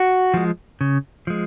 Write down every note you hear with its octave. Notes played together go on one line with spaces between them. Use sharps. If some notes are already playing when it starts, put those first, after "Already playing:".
Already playing: F#4
F3 G#3
C#3
F3 G#3